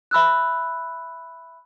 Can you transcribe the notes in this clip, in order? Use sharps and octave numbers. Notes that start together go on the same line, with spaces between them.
E5 B5 E6 F#6